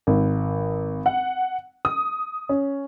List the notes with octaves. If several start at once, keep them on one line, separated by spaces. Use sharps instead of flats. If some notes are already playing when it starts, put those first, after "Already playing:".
G#1
F#5
D#6
C#4